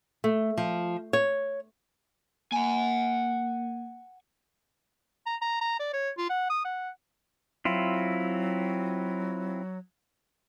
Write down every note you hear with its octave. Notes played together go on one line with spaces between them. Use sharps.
A3
F3
C#5
A#3 F#5 G#5
A#5
A#5
A#5
D5
C#5
F4
F#5
D#6
F#5
F#3 C4 E4 F4